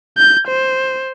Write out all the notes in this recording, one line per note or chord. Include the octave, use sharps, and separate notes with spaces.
G6
C5